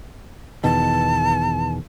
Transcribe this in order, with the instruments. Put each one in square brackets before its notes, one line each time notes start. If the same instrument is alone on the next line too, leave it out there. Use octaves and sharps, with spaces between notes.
[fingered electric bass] E2 B2 D#3 [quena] A5